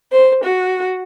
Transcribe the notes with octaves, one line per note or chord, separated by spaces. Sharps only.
C5
F#4